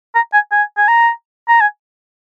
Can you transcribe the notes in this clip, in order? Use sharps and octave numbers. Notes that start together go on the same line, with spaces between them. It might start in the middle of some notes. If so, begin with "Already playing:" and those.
A#5
G#5
G#5
G#5
A#5
A#5
G#5